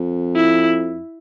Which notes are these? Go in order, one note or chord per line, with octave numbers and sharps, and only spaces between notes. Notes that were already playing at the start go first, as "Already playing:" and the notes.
Already playing: F2
E4